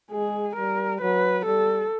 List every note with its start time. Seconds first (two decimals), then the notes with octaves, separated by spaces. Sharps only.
0.11 G#3 G#4
0.56 G3 A#4
1.01 F#3 B4
1.46 G3 A4